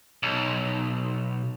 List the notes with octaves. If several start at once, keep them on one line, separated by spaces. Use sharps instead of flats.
B1